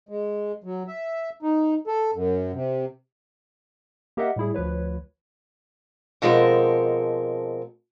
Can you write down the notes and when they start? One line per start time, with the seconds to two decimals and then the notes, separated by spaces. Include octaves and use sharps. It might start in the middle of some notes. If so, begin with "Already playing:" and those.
0.09 G#3
0.64 F#3
0.88 E5
1.43 D#4
1.87 A4
2.14 F#2
2.53 C3
4.17 A#3 G4 A#4 D#5 E5 F#5
4.36 A2 G3 E4 G#4
4.54 D2 F3 B4 C#5
6.22 B2 F3 G#3 C4 A4 A#4